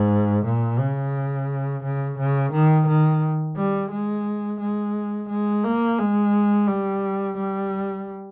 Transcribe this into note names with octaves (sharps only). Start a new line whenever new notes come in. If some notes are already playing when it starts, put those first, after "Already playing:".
Already playing: G#2
A#2
C#3
C#3
C#3
D#3
D#3
G3
G#3
G#3
G#3
A#3
G#3
G3
G3